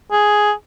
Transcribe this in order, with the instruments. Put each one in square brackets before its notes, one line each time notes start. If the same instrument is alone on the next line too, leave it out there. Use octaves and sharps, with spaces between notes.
[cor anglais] G#4